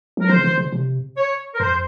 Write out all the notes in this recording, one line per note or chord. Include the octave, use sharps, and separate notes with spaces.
F#3 A#4
F3 C5
C#3
D#3
C#3
C3
C#5
A#4
F2 C5